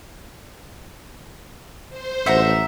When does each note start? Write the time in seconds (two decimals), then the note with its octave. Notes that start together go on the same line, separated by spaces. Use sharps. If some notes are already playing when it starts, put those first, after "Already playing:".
1.89 C5
2.26 A1 E5 F#5 A#5